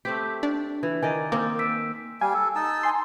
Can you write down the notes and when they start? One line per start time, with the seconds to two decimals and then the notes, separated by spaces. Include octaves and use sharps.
0.05 A3 C4 G4 B6
0.43 D4
0.83 E3
1.03 D#3 D5 D#5 G#5
1.32 D#3 A#3 C4 D6 A6
1.59 E6 B6 D7
2.21 G3 F5 G#5
2.34 A4
2.56 D#4 A5 E6
2.83 G#5 C6